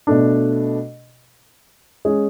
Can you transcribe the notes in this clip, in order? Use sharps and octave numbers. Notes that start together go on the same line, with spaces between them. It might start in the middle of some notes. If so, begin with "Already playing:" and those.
B2 A3 D4
G#3 C#4 G#4